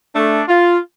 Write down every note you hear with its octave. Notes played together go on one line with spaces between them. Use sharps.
A3 D4
F4